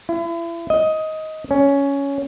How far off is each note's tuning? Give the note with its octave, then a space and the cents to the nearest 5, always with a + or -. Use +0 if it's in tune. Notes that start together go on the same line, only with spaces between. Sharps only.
E4 +35
D#5 +15
C#4 +10